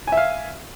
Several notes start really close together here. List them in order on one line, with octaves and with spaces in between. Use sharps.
G#5 E5 F5